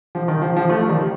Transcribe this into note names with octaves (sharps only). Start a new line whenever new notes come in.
F3
D#3
F3
F3
F3 A3
D#3 G3